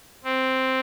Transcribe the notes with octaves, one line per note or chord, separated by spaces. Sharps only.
C4